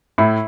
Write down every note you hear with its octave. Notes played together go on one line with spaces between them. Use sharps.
A2 E4